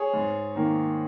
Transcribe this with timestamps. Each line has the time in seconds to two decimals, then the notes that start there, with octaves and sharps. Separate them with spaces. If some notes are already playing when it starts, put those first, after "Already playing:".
Already playing: G#4 C#5
0.13 G#2
0.55 D#3 A#3 D#4